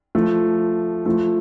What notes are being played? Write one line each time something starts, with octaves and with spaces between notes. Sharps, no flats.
F3 A3
F3 A3